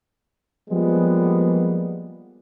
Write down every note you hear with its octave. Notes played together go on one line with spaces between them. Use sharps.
F3 G3 G#3 A#3 B3